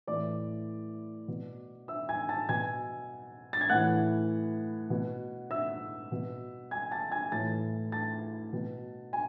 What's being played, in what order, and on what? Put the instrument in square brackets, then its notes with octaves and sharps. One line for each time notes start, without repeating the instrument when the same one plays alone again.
[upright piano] A2 E3 D5 D6
B2
E5 E6
G#5 G#6
A5 A6
B2 G#5 G#6
A6
G#6
A2 E3 F#5 F#6
B2
E5 E6
B2
G#5 G#6
A5 A6
G#5 G#6
A2 E3 A5 A6
A5 A6
B2
G#5